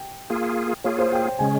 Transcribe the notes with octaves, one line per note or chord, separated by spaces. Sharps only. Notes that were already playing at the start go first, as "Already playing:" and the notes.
Already playing: G5
A#3 F4 G#4
A#3 F4 G#4 C#5
C5
G5
G5
C#3 G#3 C#4 G#5